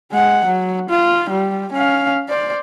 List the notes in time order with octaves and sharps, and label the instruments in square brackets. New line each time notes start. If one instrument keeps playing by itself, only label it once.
[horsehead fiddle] G#3 F#5
F#3
F4
G3
C#4 F5
C5 D5